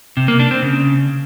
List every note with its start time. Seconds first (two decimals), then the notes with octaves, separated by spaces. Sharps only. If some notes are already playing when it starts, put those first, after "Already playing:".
0.17 C3
0.28 A#3
0.40 D4
0.51 C4
0.62 C#3